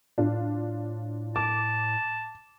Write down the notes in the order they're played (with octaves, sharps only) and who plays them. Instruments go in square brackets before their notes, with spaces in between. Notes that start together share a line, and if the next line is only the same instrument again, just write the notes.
[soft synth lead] A2 [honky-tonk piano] D4 F4
[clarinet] A5 [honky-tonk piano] D6